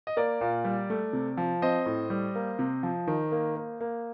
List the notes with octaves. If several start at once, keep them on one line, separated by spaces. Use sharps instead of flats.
D#5
A#3 A#4 D5
A#2
G3
A3
C3
F3
C4 C5 D#5
A2
G3
A#3
C3
F3
D#3
A#3
A#3
A#3